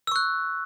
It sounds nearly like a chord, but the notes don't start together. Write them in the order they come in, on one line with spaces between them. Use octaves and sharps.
E6 C#6 F#6